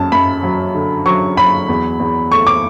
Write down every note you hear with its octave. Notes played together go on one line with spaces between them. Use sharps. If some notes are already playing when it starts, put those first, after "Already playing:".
Already playing: F#2 F#3 A5
F#2 B5
F#3
D3
F#3 C#6
F#3 B5
E2
E2
A3 C#6
D6